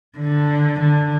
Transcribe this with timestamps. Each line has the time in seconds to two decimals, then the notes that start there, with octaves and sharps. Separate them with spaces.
0.18 D3
0.81 D3